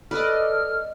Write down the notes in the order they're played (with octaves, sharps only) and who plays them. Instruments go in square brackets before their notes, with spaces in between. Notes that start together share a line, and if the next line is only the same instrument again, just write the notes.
[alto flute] A4 [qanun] B4 [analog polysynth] D5 D#5 [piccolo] F6